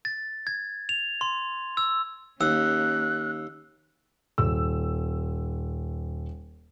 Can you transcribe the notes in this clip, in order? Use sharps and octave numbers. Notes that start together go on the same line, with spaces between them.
A6
G#6
F7
C6
E6
D#2 A#3 C#4 E6 F#6
D#1 E6